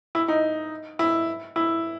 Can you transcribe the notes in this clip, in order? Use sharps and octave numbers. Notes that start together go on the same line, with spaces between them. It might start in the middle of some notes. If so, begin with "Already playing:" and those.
E4
D#4
E4
E4